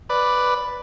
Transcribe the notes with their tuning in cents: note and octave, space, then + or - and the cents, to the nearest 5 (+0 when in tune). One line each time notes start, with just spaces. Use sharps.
B4 +0 D5 +0